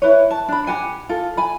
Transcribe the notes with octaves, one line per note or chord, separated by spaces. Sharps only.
E4 B4 C#5
A5
D4 B5
G4 F#5 G#5
F4 A4
G#5 B5